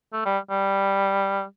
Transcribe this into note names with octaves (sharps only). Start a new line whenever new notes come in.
A3
G3
G3